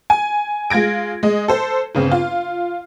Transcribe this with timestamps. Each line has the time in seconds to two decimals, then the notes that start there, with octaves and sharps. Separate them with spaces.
0.10 G#5
0.70 G#3 F4 G#6 A#6 D7
1.23 G#3 D#5
1.48 A4 C5
1.95 G1 C#3 C4
2.12 F4